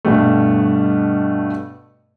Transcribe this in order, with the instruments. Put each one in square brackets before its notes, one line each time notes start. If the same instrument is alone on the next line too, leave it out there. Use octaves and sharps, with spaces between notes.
[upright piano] G2 B2 G3 A3